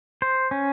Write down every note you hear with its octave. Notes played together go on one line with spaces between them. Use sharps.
C5
C#4